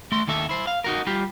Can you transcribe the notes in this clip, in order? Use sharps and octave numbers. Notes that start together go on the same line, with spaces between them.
A3 C6
D#2 D#3 A4 E5 A5
E4 C5
F5
D#4 F#4 A#4
G3 F4 G4